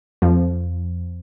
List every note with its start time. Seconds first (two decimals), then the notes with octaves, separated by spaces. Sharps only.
0.22 F2 F3